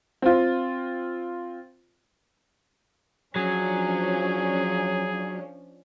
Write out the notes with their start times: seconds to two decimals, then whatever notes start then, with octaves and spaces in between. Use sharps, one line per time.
0.22 C4 F4
3.36 F3 F#3 C#4 D4 G#4